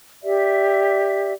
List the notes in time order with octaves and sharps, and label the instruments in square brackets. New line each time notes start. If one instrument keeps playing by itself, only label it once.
[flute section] G4 D5 E5